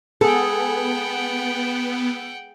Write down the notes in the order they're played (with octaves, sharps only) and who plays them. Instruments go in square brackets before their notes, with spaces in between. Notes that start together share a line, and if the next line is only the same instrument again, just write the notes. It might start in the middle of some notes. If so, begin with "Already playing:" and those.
[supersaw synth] B3 [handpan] G#4 [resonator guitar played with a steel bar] A4 [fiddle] F#5 G5